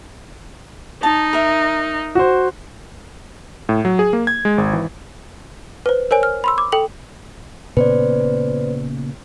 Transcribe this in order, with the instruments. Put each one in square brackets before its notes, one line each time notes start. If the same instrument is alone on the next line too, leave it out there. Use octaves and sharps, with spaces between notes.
[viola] D#4 [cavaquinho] A5
[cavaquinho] A#4 E5
[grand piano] F#4 C5
[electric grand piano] A2
F#3
G#4
A#3
G#6
G#3
G#1
E3
[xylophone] B4 C5
A#4 C5 C#5 G#5
F6
B5 C6 E6
D6
A4 G5 F#7
[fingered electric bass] A#2 C#3 B3 [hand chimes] B4 C5 D5